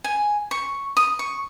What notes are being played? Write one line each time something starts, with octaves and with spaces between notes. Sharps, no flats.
G#5
C#6
D#6
C#6